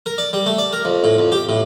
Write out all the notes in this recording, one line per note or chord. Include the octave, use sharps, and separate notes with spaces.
A#4
D5
G3
A3
D5
A#4
F2
A2
F2
G4
A2